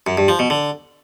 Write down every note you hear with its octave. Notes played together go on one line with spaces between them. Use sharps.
F#2
G2
F3
B2
D3